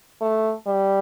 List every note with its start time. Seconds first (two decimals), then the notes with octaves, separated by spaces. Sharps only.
0.21 A3
0.67 G3